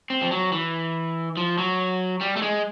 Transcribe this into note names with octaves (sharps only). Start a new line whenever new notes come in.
C4
F3
F#3
E3
F3
F#3
G3
A3
G#3